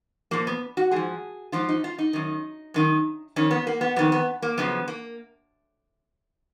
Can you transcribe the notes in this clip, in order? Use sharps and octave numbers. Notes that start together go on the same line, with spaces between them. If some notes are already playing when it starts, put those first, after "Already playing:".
A#2 F3 A#3
B3
F#4
G#2 F3 G#4
G#2 F3 F4
D#4
F4
D#4
F#2 D#3
F#2 D#3
F2 D#3 C#4
B3
A#3
B3
F2 D#3 B3
B3
A#3
F#2 C#3 F3 B3
A#3